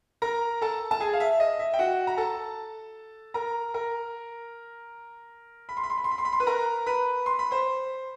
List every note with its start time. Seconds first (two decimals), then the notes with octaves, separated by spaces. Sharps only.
0.22 A#4 A#5
0.62 A4 A5
0.91 A5
1.00 G#4 G#5
1.13 F5
1.20 E5
1.40 D#5
1.59 E5
1.74 G5
1.79 F#4 F#5
2.07 A#5
2.18 A4 A5
3.34 A#4 A#5
3.74 A#4 A#5
5.69 B5
5.77 C6
5.83 B5
5.90 C6
5.98 B5
6.04 C6
6.11 B5
6.18 C6
6.25 B5
6.33 C6
6.40 B4 B5
6.47 A#4 A#5
6.86 B4 B5
7.26 C6
7.39 B5
7.51 C5 C6